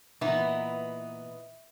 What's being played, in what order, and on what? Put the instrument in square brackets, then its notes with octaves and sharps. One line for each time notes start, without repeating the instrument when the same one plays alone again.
[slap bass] A#2 [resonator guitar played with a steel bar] E3 B3 D#4 [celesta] E5